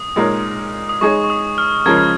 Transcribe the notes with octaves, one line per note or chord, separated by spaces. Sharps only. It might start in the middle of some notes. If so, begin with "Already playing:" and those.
Already playing: D#6
A#2 G#3 D#4 A#4 C#5
D#6
G#3 D#4 G#4 C#5 C#6
C#6
D#6
F6
C#3 F3 G#3 C#4 A#4 G#6